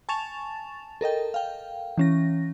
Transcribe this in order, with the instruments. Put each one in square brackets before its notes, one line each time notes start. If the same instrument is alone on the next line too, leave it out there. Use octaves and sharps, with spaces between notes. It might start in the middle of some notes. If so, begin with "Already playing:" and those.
[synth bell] G#5 A5 C#6 A6 E7 F7
A4 A#4 D#5 G5
F5 G5
E3 C#4 A#6